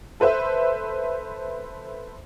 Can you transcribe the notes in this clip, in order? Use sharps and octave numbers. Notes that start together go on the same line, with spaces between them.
A4 B4 C5 E5